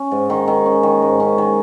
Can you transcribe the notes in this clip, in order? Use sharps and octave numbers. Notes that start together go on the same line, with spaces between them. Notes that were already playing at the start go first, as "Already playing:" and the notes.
Already playing: C#4
G#2
D#3
D#3
C#4
D#3
G#2
C#4
D#3